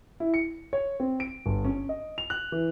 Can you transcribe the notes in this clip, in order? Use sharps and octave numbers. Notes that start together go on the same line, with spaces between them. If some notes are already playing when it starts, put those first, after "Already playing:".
E4
C#7
C#5
C4
D7
G1
C#4
D#5
F7
F#6
E3